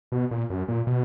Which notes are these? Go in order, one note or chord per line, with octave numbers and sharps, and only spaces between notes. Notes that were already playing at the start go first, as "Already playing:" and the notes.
B2
A#2
F#2
A#2
B2